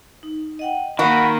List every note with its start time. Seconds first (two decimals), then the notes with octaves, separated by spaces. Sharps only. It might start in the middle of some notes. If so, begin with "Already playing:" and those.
0.23 D#4
0.59 D#5 F#5 G5
0.99 D#3 A#3 F#4 F5 B5